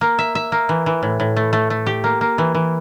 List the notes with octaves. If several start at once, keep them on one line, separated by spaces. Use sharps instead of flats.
A#3
E5
E5
A#3
E3
E3
A2
A2
A3
A3
A3
G4
A#3
A#3
E3
E3